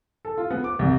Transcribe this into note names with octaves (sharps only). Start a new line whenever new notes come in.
A4
F4
B3
D6
C2